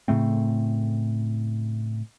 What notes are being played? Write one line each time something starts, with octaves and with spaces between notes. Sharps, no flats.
A2 C#3 A3 C4